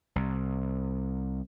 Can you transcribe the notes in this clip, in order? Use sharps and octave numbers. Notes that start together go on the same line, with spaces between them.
C2